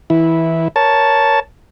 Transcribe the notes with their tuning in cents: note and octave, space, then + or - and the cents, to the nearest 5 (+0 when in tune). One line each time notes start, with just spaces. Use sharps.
E3 -15 E4 -10
A#4 +10 C#5 +10 A5 +0